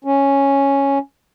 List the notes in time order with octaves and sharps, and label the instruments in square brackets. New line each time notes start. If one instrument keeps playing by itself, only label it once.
[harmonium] C#4